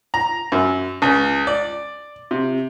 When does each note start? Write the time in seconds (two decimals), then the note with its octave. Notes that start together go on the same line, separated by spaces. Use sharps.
0.14 A#5
0.52 F#2
1.02 C#2
1.47 D5
2.31 C3